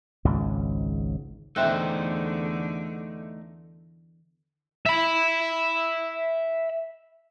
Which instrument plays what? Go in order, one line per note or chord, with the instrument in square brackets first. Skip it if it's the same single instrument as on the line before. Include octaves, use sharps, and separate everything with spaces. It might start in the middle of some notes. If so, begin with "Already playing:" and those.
[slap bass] G#1 C#2 G#2 C#3
[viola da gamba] E2 D3 [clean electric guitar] A3 D#4 C5 [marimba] E5 G5 F#6
[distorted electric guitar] E5 B5